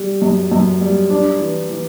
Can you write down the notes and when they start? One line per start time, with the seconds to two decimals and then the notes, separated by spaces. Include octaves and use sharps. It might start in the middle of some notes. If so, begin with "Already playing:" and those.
Already playing: G3
0.22 F#2
0.52 F#2
0.81 G3
1.10 D4
1.40 E3
1.69 E3